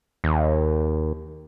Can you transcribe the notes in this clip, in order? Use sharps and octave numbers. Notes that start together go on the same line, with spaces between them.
D#2